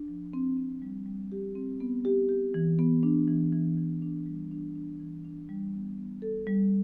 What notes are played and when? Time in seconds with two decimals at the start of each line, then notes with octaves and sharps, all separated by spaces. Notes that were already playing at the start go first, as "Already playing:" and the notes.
Already playing: D4
0.08 F3
0.34 C4
0.57 C4
0.82 G3
1.06 G3
1.32 G4
1.55 C4
1.80 B3
2.05 G4
2.29 G4
2.54 E3
2.79 B3
3.03 D4
3.28 E3
3.52 E3
3.77 E3
4.02 D4
4.26 G3
4.51 D4
4.75 D4
5.00 E3
5.24 D4
5.49 G3
5.74 B3
5.98 B3
6.22 A4
6.47 G3